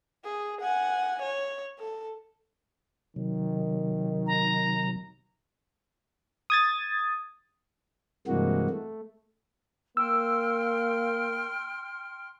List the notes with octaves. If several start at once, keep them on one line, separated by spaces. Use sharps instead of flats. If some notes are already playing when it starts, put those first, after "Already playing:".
G#4
F#5 G#5
C#5
A4
C3 D#3 F#3
A#5
D#6 G#6 A6
G2 C3 E3 G#3 A#3 F#4
A3
A#3 G5 C6 E6 F6